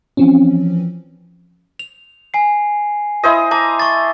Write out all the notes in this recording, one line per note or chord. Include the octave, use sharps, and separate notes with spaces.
E3 F3 C4 C#4
F7
G#5 C7
E4 C5 D#5
A5 A#5 D6
C#6 A6